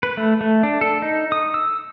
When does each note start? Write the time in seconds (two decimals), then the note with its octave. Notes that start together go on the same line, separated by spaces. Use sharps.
0.03 B4
0.17 A3
0.41 A3
0.63 D4
0.81 A4
1.02 D#4
1.32 D#6
1.54 E6